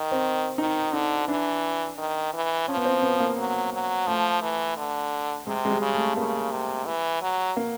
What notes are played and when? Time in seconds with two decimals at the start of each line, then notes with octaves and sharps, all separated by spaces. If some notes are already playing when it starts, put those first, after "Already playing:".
Already playing: D#3
0.12 C4
0.58 D#3 D#4
0.93 D3 D#4
1.28 E3 D4
1.98 D#3
2.33 E3
2.68 F3 C#4
2.77 B3
2.85 C4
3.02 B3
3.20 A#3
3.38 F#3
3.73 F#3
4.07 F3 A3
4.42 E3
4.77 D3
5.46 C3 G#3
5.65 G#3
5.70 G3
5.82 C#3
5.94 A3
6.17 C#3 A#3
6.52 C3
6.86 E3
7.21 F#3
7.57 A#3